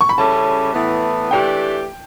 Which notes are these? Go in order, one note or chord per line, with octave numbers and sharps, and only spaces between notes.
C#6
B5
C#3 G3 C#4 E4 A4 A5
A2 E3 B3
E3 A3 D4 G4 G5